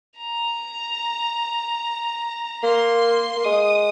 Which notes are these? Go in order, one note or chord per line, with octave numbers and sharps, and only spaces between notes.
A#5
A#3 C6
A#3
G#3 D#6